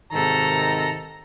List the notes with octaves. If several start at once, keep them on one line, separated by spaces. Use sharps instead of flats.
G#2 C3 D#3 A4 A#5